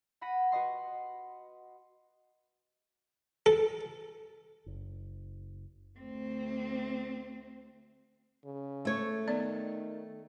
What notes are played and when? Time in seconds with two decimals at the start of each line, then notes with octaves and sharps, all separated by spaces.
0.21 F#5 B5 A#6 B6 D#7
0.52 F#4 B4 D#5 C6
3.46 A4
4.66 F#1
5.98 D2 C4
8.45 C#3
8.85 A3 C#5
9.28 D#3 B3 D5